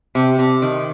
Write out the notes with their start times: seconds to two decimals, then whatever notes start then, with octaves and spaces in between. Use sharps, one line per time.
0.15 C3
0.39 C3
0.62 D#3